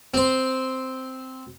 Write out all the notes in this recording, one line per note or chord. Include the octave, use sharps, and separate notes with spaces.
C4 C5